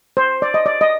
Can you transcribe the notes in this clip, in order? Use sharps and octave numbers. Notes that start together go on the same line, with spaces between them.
C5
D5
D#5
D5
D#5